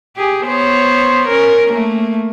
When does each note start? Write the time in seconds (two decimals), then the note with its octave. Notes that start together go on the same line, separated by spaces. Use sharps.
0.16 G4 G#4
0.45 B3 C5 C#5
1.27 C#4 A#4
1.72 A3 A#3